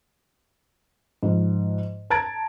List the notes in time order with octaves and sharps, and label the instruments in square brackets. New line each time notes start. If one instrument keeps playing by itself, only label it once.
[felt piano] G#2 F3
A5 A#5 G#6 A6 D7